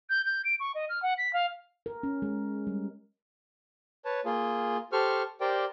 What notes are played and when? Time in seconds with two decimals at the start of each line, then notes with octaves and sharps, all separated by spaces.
0.10 G6
0.26 G6
0.45 D7
0.60 C#6
0.75 D#5
0.89 F6
1.03 F#5
1.18 B6
1.33 F5
1.86 A#4
2.03 C#4
2.22 G#3
2.67 G3
4.05 B4 C#5 A5
4.25 A#3 F4 G#4
4.92 G4 A4 C5 C#6 F6
5.41 G4 A#4 C5 D5 G5